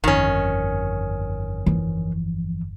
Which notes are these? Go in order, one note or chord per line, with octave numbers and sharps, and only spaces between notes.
G1 F2 D#3 C#4
E3 F3